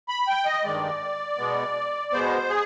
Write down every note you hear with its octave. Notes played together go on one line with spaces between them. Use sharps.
B5
G5
D#5
G2 D#3 G#3 D5
B2 G#3 B3
B2 G#3 B3 C5
G#4